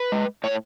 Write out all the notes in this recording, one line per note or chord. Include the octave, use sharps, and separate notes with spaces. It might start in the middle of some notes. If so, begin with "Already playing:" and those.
Already playing: B4
G#3
A2 C#5